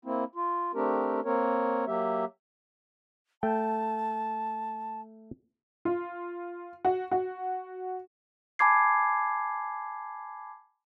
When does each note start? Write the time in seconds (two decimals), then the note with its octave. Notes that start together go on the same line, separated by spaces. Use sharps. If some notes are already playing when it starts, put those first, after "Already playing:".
0.05 A#3 C4 E4
0.35 F4
0.74 A3 C4 D4 G4 A#4
1.25 A#3 C4 A#4 C#5
1.87 F#3 A#3 G4 E5
3.43 A3 G5 A5
5.85 F4
6.85 F#4
7.11 F#4
8.59 G#5 A5 B5 D6 G#6 C7